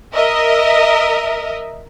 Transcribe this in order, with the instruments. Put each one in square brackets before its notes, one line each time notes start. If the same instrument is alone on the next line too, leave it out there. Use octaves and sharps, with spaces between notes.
[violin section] A#4 D#5 E5